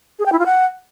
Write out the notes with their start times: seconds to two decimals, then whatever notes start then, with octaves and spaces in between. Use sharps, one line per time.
0.19 G#4
0.26 G5
0.32 E4
0.39 F4
0.46 F#5